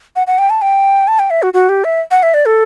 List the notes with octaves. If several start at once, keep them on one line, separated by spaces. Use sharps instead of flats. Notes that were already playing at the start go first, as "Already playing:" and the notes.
F#5
F#5
G5
A5
G5
A5
G5
E5
F#4
F#4
G4
E5
F#5
E5
D5
A4